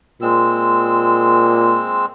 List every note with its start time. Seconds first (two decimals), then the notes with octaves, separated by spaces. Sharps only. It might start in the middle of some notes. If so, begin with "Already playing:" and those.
0.22 A#2 G#3 C4 E6